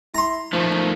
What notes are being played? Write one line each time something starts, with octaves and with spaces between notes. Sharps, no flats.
E4 A#5 C6
D#3 F3 A3